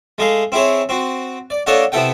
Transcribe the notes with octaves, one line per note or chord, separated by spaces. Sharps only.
G#3 A3 G#4 F5
C4 E4 G#4 C#5
C4 F#4
D5
A#3 D4 A4 C#5 D#5 F#5
C3 B3 E4 A4 F#5 G5